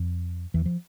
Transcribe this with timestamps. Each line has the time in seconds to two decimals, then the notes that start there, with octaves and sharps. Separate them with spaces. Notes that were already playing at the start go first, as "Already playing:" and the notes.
Already playing: F2 F3
0.54 E2 E3
0.66 F3